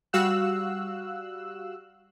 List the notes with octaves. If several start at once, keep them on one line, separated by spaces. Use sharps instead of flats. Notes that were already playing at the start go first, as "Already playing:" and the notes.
G3 F#4 F5 E6 F#6